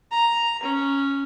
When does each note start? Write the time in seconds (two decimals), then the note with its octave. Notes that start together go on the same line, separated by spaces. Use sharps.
0.11 A#5
0.63 C#4